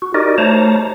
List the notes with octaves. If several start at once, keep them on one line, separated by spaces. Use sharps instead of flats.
F#4
D#4 F#4 G4 A#4 D5 D#5
A3 C5 C#5 A5 A#5